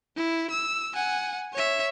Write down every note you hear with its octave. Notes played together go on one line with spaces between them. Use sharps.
E4
E6
F#5 G#5
C#5 E5